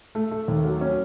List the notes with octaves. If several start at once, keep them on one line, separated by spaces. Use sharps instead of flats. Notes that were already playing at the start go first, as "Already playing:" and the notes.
A3
A3
D#2
F#3
C#4